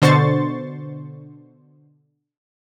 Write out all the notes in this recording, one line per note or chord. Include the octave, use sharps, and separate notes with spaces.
B2 D3 C5 C6 C#6 A6